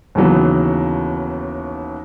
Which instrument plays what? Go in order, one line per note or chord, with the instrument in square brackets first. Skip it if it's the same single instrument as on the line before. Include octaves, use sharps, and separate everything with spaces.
[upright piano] D#2 C#3 E3 F#3 B3